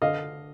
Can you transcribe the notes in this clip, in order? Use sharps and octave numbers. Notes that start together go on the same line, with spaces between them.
D3 D#5 F5